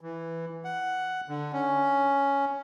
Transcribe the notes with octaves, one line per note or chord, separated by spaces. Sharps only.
E3
F#5
D3
C#4